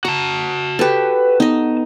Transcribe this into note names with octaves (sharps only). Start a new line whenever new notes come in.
F#4 A5 A#5
G4 A4 B4
B3 D#4 D#5